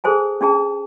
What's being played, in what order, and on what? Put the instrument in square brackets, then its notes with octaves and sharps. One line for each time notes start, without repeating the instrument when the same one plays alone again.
[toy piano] G#4 A4 C5 G#5 A5
C#4 D4 G#4 A5